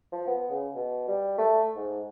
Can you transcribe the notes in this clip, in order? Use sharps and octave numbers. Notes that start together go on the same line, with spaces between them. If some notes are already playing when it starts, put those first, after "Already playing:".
F3
B3
C#3
B2
G3
A3
G#2